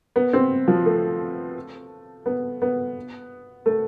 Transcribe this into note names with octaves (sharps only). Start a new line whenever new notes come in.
B3
C4
F3
A3
B3
B3
A3